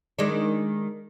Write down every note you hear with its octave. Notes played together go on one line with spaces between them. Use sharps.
D#3 G#3 D4